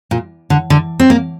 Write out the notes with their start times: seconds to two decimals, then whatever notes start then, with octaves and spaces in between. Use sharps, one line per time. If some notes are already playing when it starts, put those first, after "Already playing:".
0.11 A#2
0.50 D3
0.70 D3
1.00 C4
1.10 A#3